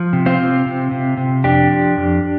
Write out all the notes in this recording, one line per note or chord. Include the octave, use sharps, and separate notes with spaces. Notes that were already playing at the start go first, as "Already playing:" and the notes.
Already playing: F3
C3
C4 F4
C3
C3
C3
C3
F2 D4 G4
F3
F2